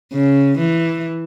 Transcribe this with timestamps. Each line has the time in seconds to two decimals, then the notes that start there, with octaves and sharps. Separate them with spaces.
0.13 C#3
0.57 E3